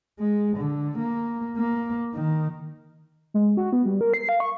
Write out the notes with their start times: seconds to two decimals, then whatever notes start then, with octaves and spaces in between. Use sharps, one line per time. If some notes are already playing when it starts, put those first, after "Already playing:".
0.20 G#3
0.57 D3
0.98 A#3
1.57 A#3
2.14 D#3
3.34 G#3
3.57 F#4
3.72 B3
3.86 G3
4.01 A#4
4.14 C7
4.29 F5
4.40 C#6